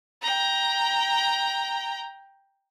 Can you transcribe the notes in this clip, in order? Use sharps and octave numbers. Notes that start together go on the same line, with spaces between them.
G5 A#5